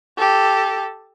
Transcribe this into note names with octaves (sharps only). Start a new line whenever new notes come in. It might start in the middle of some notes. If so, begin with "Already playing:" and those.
G4 A4